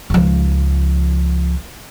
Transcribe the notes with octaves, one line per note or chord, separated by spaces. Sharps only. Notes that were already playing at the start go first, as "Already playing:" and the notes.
C#2 F3